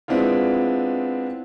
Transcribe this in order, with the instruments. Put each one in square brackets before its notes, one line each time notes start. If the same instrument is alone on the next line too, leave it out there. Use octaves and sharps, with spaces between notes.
[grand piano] G#3 B3 C4 D4 E4 F4